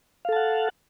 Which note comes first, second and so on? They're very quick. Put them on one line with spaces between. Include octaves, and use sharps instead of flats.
F5 A4 A5 F#5